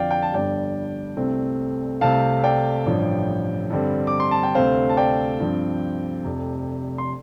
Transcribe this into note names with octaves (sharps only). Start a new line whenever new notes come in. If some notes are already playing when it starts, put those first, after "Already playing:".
Already playing: F2 D3 F3 D5 F5 G5
G5
A5
G1 G2 G3 D5 G5
C2 C3 A3 C4
C2 C3 A3 C4 F5 A5
D5 G5
A1 G2 F3
G2 D3 G3 C4
D6
C6
A5
G5
D2 C3 A3 C4 C5 F5
A5
D5 G5
G2 F3 C4
F1 F2 C3
C6